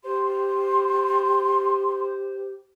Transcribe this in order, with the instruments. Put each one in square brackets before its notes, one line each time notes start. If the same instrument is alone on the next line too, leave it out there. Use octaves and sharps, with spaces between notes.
[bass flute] G4 [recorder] C5 [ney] C6